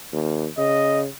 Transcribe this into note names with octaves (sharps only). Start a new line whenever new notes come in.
D#2
C#3 D#5